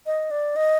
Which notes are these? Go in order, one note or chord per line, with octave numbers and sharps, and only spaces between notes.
D#5
D5
D#5